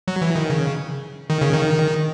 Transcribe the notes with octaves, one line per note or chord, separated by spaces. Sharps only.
F#3
E3
D#3
C#3
D#3
C#3
D#3